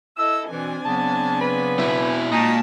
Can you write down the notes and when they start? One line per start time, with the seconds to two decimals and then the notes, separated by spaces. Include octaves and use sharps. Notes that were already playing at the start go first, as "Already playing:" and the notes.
0.17 E4 A4 D#5 E6
0.49 B2 E3 C4 D4 G#5
0.85 C#3 F#3 B3 A5
1.41 B4
1.79 B2 E4
2.32 A#2 G#3 D#4 F#4 A5